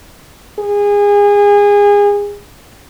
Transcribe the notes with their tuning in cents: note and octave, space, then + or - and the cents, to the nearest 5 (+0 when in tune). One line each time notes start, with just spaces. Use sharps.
G#4 -25